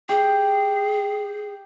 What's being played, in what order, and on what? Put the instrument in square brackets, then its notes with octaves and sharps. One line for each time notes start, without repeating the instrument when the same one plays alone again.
[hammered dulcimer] G4 [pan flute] G#4